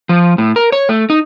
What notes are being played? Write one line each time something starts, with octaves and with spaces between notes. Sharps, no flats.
F3
A2
A#4
C#5
A3
D#4